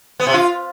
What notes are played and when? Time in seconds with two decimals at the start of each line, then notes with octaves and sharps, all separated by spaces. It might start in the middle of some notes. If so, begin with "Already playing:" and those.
0.20 B3
0.27 C3
0.34 F4